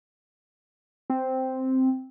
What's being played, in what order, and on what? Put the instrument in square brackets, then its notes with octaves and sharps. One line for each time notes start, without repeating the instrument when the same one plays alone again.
[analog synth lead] C4